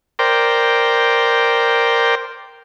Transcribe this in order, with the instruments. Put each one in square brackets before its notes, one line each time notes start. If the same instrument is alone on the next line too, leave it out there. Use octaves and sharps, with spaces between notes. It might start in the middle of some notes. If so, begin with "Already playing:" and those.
[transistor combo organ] A#4 C5 D5 G5